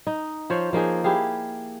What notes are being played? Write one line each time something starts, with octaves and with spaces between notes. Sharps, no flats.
D#4
F3 C5 C#5
F3 A#3 D#4 G#4
E4 G4 G#4 F5